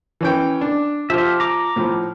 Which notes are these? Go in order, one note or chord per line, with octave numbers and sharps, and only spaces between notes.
E3 C#4 G5
D4
F3 F4 G4 E5
A#5 D6
A2 F3